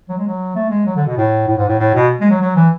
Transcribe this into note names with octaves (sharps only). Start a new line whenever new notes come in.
F#3
G#3
F#3
A3
G#3
F#3
D3
B2
A2
A2
G#2
A2
A2
B2
G#3
F#3
F#3
E3